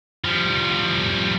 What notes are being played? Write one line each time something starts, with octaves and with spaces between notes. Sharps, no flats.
F3 G3